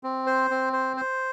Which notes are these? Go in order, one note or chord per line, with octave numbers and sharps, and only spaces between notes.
C4
C5
C4
C5
C5